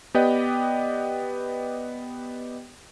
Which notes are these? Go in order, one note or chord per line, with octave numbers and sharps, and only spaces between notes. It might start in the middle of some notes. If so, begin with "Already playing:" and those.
B3 G4 B4 D5 D#5 G5